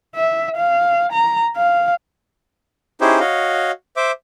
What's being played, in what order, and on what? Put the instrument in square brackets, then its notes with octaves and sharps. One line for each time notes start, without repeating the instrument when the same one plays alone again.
[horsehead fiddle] E5
F5
A#5
F5
[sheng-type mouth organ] C#4 D#4 E4 G4 G#4 C5
F#4 C#5 D#5 F5
C5 E5 D6